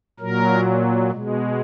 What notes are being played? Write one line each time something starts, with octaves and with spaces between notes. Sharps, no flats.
A#2 F#3 A#4
B2 G#3